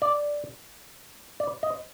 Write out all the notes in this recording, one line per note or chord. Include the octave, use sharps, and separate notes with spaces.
D5
D5
D#5